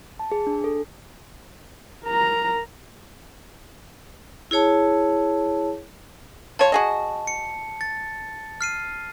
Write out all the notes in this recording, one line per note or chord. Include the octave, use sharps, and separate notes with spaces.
A5
G#4
D4
A4
A#4 A#5
E4 G#4 C#5 A5
F3 C#5 A5
F#4 G#4 D#5
C#7
A6
F6 C7 D#7